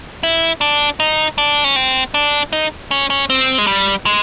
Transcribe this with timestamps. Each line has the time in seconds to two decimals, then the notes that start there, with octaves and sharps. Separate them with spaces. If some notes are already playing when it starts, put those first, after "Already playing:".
0.23 E4
0.61 D4
1.00 D#4
1.38 D4
1.64 C#4
1.76 C4
2.14 D4
2.53 D#4
2.91 C#4
3.10 C#4
3.30 C4
3.58 G#3
3.67 G3
4.06 G#3